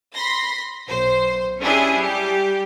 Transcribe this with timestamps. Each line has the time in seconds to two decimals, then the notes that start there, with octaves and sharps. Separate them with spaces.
0.13 B5 C6 A#6
0.87 B1 C5
1.61 C#4 D4 E4 G4 G#4
1.97 G3 G4